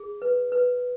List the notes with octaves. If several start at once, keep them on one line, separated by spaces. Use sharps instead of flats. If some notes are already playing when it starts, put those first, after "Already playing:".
Already playing: G#4
B4
B4